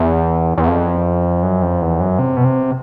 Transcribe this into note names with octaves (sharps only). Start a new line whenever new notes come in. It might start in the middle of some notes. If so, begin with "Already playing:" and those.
Already playing: E2
E2
F2
F#2
F2
E2
F#2
C3
B2
C3